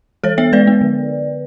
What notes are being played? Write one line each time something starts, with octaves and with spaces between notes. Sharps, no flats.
E3 A4 C#5
B3 C#5 E5
G#3 B4 D5
B3
D3